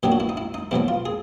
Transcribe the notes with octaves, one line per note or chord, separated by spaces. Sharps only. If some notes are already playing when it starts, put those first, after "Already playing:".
A#2 F#3 B3 D4 G4
F#4
E4
D#4
E4
D#4
E2 B2 F#3 B3 E4
F4
G#4